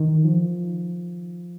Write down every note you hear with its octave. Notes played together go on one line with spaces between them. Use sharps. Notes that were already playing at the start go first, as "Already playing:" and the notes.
Already playing: D#3
F3